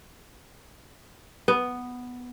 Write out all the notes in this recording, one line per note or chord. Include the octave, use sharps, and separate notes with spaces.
B3